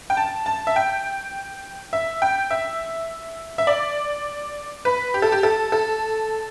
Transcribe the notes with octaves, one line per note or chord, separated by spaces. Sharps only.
G5
A5
A5
E5
G5
E5
G5
E5
E5
D5
B4
G4
A4
G4
A4
A4